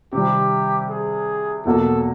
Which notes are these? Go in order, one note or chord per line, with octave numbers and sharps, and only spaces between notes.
C3 D#3 G3 G4
G#4
E2 B2 F#3 A#3 A4